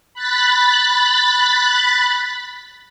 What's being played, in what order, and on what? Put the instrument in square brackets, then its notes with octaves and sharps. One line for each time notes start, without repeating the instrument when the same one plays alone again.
[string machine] B5 F#6 A6 B6